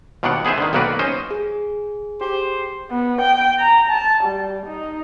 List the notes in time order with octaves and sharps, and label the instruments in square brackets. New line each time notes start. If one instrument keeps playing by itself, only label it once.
[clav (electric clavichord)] D#2 B2 D#3 D4 D5 F#5
B3 G#4 B4 C5 E5
D3 D#3
B1 D#3 A#3 F#4 B4 D5
C#4 C5 D#5
[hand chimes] G#4
[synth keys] G4 [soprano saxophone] C5
[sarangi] B3
G5
A#5
A5
G3
D#4